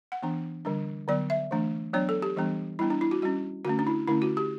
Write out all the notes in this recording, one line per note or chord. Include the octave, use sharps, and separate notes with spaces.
F#5
E3 B3 D4
D3 G3 D4
D3 F#3 B3 D5
E5
E3 A3 D4
F#3 B3 D4 C#5
A4
G4
E3 G3 B3 D4
G3 B3 D4 E4
D4
E4
F#4
G3 C#4 F#4
D3 A3 C#4 F#4
D4
E4
D3 A3 C#4 E4
F#4
G4